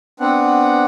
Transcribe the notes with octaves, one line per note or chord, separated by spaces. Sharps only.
B3 C4 D4 F#5